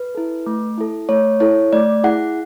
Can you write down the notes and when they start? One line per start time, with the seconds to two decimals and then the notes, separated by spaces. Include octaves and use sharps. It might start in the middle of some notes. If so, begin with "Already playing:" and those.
Already playing: B4
0.15 E4 A4
0.46 A3
0.78 E4 A4
1.09 A3 C#5
1.40 E4 A4 C#5
1.73 A3 D5
2.04 E4 G#4 F#5